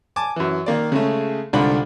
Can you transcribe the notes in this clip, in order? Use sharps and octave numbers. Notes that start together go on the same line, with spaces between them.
G#5 A5 D6
F#2 E3
D#3 A#3 D5
C#3 G#3 A3
C2 G#2 D3 F4 D5 B5